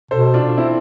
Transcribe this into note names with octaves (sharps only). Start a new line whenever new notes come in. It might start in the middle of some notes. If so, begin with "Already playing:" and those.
B2 A4 C5
D4 F4
C4 E4